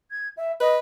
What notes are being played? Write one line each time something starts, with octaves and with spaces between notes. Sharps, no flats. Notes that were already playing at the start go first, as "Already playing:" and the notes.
G#6
E5
B4 D#5